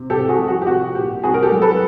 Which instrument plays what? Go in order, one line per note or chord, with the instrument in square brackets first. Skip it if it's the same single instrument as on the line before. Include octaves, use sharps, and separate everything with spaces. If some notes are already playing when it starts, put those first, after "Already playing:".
Already playing: [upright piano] C3
C2 G4 A4
F#4 G#4
F3
F#4
G4
C2 F#4
A#2 G4
C2 F#4 G#4
A#4
G4 A4
F#3
A4 B4